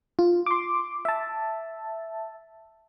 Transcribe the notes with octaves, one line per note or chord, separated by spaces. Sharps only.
F4
C6 D6
E5 A5